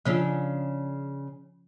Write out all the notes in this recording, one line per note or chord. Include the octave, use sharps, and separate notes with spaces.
C#3 F3 C#4 D4 F4